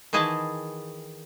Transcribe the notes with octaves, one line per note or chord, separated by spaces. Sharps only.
D#3 E3 G#4 D#5 E5 A5